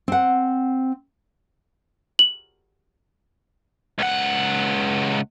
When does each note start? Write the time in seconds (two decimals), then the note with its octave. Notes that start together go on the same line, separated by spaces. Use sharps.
0.08 C4 F#5
2.19 F#7
3.99 C#2 F#5